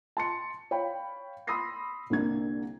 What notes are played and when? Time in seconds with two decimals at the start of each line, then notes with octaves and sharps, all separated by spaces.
0.17 A5 C6 C#7
0.71 C#5 F5 G5 B5
1.47 B5 C6 D#6 E6 A#6 C7
2.10 C2 D3 A#3 G#6